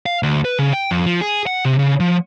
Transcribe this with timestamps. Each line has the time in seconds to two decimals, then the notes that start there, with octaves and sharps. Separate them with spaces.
0.06 F5
0.23 D2
0.45 B4
0.58 C#3
0.73 G5
0.91 F2
1.06 F3
1.21 G#4
1.47 F#5
1.65 C3
1.79 C#3
2.00 F3